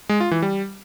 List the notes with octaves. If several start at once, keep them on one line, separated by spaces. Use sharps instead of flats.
G#3
F4
E3
G3